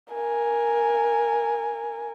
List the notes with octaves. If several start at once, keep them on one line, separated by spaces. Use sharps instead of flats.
A#4 G#5